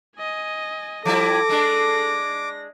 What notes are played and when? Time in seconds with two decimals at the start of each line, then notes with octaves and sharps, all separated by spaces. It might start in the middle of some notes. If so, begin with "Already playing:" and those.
0.18 D#5 G#5
1.05 F3 G3 E4 A4 D6 A#6
1.49 G#3 D4